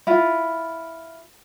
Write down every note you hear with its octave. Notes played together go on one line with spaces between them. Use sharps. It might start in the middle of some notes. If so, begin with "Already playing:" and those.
E4 F4